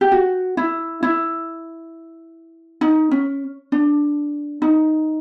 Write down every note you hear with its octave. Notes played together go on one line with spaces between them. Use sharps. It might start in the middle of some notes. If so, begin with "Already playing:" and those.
G4
F#4
E4
E4
D#4
C#4
D4
D#4